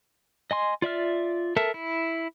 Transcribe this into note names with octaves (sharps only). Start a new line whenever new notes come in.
D#5 G#5 C6
F4 D5 E5 F6
A4 A#4 E5 A5
E4